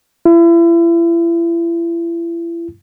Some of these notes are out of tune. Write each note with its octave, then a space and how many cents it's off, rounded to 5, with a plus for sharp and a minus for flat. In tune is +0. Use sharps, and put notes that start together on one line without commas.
E4 +35